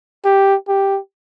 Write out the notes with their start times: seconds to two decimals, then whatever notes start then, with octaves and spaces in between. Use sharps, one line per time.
0.25 G4
0.69 G4